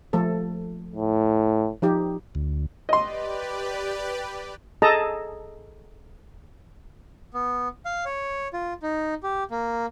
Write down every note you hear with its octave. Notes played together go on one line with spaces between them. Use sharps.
F3 A3 A4
A2
F3 D#4 G4
D2
G4 B4 D5 D#5 C6
G#4 A4 D#5 A5 A#5
B3
F5
C#5
F4
D#4
G4
A#3